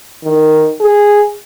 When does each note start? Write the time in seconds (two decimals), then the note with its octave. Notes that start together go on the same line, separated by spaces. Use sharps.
0.24 D#3
0.80 G#4